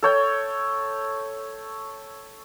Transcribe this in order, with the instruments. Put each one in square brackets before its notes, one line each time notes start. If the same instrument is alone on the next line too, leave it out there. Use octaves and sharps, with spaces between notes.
[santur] A4 C#5 G5